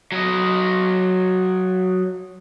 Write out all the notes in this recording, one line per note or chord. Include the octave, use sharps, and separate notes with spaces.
F#3 D#5